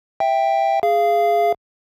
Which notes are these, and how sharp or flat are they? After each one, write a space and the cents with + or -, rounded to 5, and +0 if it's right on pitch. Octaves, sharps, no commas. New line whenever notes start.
E5 +0 G5 +5
G#4 +0 F5 -20